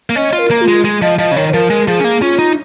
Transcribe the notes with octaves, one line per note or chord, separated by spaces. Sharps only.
A#3
C#4 D#5
F4
A#4
A#3
F4
G#3
G#3
F3 D#5
F3 D#5
C#3
D#3 C#5
C#5
F3 A#4
G#3
F3 G#4
C#4
A#3
C#4 F4
D#4